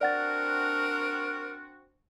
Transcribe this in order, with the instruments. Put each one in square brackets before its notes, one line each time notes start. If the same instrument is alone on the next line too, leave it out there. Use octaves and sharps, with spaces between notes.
[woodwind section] C4 D4 F#4 [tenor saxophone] A#4 [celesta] D5 F#5 A6